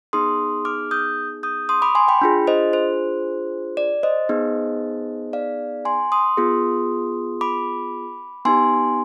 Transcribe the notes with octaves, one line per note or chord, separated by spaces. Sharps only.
B3 D#4 G#4 C6 D#6
D6 F6
D#6 G6
D#6 G6
C6 D#6
B5 D6
G#5 C6
G5 B5
D4 F4 G#4
C5 D#5
C5
D5
C5 D#5
B3 D#4 G#4
D5 F5
G#5 C6
C6 D#6
B3 F4 G#4
B5 D6
B3 D#4 G4 G#5 C6